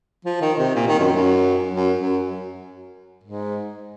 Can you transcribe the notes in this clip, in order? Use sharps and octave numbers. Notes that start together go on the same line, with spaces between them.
F3
D#3
C3
A#2
D#3
F#2
F#2
F#2
F#2
G#2